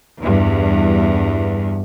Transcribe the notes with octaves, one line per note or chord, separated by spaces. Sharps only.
E2 G2